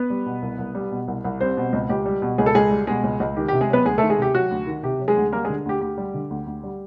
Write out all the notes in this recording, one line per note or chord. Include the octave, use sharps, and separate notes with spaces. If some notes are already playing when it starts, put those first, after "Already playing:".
Already playing: B3 B4
G3
B2
C2
C2
G3
B2
C2
C2
G3 C4 C5
B2
C#2
C#2 G4
G3
B2
C#2 G#4
A4
C#2 G#3 G#4
G3
B2 G#3 G#4
C#2
C#2
D#3 G4
G4
C3
G#3 G#4
F#3 B3 B4
D2 G#3 G#4
A3 A4
D#3
G#3 G#4
C3 G4
F#3 F#4
D2
D#3
C3 G4
F#3
G#3 G#4
D2
G3 A#3 A#4
G#3 G#4
D3
D2 G4
D2 G4
G3
D3
D2
D2
G3